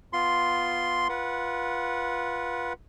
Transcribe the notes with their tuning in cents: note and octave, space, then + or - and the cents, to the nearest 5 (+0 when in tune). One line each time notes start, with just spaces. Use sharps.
B3 +0 F4 +0 C6 +0
F4 +0 B4 -20 F#5 +0